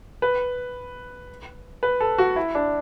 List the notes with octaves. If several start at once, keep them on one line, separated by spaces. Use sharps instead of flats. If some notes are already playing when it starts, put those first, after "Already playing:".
B4
B4
A4
F#4
E4
D4